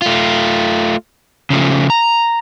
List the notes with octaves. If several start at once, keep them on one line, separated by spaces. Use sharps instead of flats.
A3 F4
C#3 F3 A3
A#5